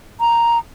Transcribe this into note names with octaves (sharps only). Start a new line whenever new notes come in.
A#5